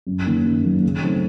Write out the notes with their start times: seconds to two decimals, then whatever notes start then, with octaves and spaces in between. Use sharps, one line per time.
0.07 F#2
0.26 D#3 F#3 A#3
0.45 F#2
0.64 D#3 F#3 A#3
0.83 C#3
1.02 F#3 A3 C4 D#4